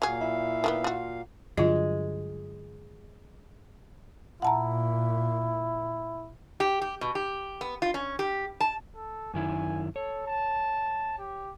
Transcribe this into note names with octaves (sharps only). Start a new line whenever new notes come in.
A#2 F#3 G#4 F5
E4
D#3 A3 B3
F4 F#4
G2 D3 F#3 G#3 F4 D#5
A#2 E4 F#5 A5 A#5
G4
G4
B2
G4
B3
F4
C#4
G4
A5
A4
F#2 D#3 E4 G#5
A4 C#5
A5
G4